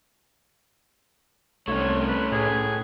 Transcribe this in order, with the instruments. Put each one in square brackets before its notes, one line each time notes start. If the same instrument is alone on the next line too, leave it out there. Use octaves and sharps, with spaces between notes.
[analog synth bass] C2 [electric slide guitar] A3 C#4 [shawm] C#5
[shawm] B4
[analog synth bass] A2 [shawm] G#4